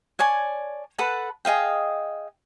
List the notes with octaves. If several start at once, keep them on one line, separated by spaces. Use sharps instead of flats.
C#5 D5 G#5 A5
A4 B4 F#5 A5
G#4 D#5 F5 G5